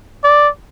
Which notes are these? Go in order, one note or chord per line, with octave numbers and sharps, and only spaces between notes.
D5